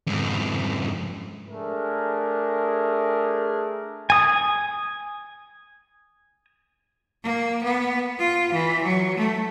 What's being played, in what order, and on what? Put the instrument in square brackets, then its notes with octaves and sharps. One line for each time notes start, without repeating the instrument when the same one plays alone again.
[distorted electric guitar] F2 G#2
[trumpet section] A3 D4 G#4 A#4
[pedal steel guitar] G#5 D#6
[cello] A#3
B3
F4
E3
F#3
A3